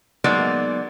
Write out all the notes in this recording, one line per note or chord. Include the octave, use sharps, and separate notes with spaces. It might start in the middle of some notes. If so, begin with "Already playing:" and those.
F#3 G#3 A#3 B3 D#4 D5